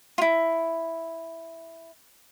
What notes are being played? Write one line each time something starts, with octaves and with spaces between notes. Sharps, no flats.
E4 F4